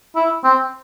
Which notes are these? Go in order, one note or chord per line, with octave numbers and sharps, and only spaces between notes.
E4
C4